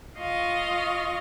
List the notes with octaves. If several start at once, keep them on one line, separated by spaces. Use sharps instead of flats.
F4 D#5 F5 C#6